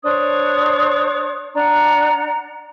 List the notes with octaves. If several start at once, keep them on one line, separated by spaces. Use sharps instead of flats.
D4 C5 C#5 D#6
D4 F#5 A#5